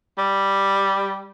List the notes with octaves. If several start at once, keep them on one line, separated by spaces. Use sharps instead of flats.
G3